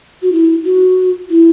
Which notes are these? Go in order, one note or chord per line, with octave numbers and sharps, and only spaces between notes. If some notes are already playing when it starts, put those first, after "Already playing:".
F#4
E4
F#4
E4